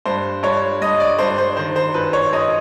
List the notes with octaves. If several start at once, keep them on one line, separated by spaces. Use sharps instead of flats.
G2 C5
G2 C#5
G2 D#5
D5
G2 C5
C5
D#3 C5
C5
F#2 B4
C#5
F#2 D#5